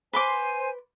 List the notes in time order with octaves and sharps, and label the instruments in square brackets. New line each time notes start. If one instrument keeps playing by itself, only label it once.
[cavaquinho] B4 C6 D6 [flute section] C5 G#5